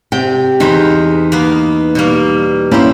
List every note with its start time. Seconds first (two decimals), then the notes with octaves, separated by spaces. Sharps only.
0.12 C3 G5
0.60 E2 D#4 C5 B5
1.32 A#3 B3
1.95 B2 G3 A#3
2.71 A#3 C#4 E4 G4 C5